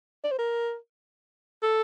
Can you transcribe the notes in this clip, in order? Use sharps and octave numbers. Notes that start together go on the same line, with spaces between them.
D5
C5
A#4
A4